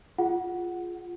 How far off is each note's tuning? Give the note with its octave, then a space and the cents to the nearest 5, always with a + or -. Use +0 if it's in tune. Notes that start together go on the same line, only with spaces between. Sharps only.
F4 +0 G#4 +0 F#5 +0